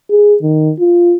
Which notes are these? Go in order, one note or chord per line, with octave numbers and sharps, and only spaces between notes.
G#4
D#3
F4